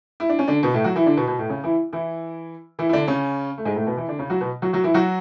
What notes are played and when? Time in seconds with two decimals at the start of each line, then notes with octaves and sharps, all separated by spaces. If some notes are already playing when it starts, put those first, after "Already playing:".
0.20 E4
0.29 D4
0.39 C#4
0.48 D3 D4
0.63 B2 B3
0.74 A2 A3
0.84 F#3 F#4
0.95 E3 E4
1.06 D3 D4
1.17 B2 B3
1.27 B2 B3
1.39 A2 A3
1.49 C#3 C#4
1.64 E3 E4
1.93 E3 E4
2.79 E3 E4
2.89 E4
2.93 D3 D4
3.08 C#3 C#4
3.58 A3
3.65 G#2 G#3
3.76 A2 A3
3.87 B2 B3
3.97 E3 E4
4.08 D3 D4
4.19 C#3 C#4
4.30 F#3 F#4
4.41 B2 B3
4.62 F#3 F#4
4.73 F#3 F#4
4.84 E3 E4
4.94 F#3 F#4